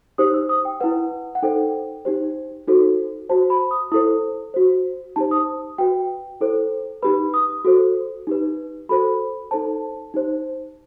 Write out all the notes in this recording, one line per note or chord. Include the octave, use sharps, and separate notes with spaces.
D#4 G4 C5 D#6
E6
D#6
G5
E4 B4 F#5
F#5
D#4 A4 C5 G5
D#4 G4 C5
D#4 F#4 A4 C5
F#4 C5 A5
B5
D#6
E4 A4 C5 D#6
F#4 C5
D#4 G4 C5 A5
D#6
F#4 B4 G5
E4 A4 C5
D#4 G4 B4 B5
D#6
F#4 A4 C5
D#4 G4 B4
F#4 A4 C5 B5
D#4 A4 C5 A5
D#4 G4 C5